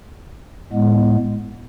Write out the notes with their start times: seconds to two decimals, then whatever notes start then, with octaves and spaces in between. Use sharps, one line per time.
0.72 A2 G#3 B3